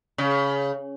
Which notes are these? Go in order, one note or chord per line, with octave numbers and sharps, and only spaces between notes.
C#3